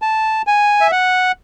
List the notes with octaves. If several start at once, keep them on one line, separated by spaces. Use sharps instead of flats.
A5
G#5
E5
F#5